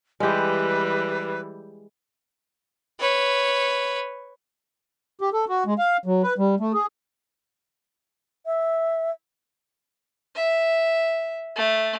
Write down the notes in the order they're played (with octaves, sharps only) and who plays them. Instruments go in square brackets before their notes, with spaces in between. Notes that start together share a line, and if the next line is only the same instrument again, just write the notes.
[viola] E3 G3 [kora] G#3 G4 [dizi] B4
[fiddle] B4 C#5
[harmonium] G4
A4
F#4
G#3
F5
F#3
B4
G3
A3
G#4
[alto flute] E5
[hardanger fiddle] E5
A3